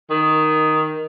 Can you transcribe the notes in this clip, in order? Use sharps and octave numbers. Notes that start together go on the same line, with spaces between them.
D#3